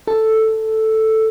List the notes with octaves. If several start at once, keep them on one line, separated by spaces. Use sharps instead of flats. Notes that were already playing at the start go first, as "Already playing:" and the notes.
A4